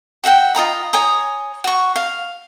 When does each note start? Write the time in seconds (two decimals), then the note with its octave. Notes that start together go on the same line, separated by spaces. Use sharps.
0.24 F#4 E5 F#5 G5
0.55 F4 D#5 A#5 B5
0.93 C#5 G#5 A#5 D#6
1.64 F#4 C#6
1.96 F5